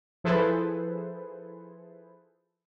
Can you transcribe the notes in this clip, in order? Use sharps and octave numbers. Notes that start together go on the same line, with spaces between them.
F3 E4 G#4 A4 B4 C5